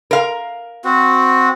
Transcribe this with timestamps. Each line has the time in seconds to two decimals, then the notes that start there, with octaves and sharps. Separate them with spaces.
0.11 A#4 F5
0.84 C4 F#4